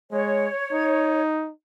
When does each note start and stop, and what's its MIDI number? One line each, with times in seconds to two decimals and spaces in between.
0.12 0.49 56
0.12 1.21 73
0.72 1.52 63